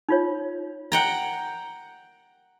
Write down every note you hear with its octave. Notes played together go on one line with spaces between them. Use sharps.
D#4 F4 C#5
F#5 G5 A#5